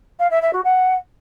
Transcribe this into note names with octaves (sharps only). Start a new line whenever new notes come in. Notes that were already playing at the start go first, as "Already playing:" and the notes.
F5
E5
E5
F#4
F#5